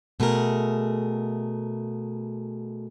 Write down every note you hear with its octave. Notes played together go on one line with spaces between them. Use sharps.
B2 A3 G#4 A#4